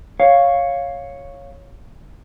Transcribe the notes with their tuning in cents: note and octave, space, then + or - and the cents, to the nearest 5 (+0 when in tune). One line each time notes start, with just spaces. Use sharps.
C#5 +0 F5 +5